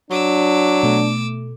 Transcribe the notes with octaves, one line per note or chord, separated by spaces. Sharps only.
F#3 D4 D6 E6
B2 A3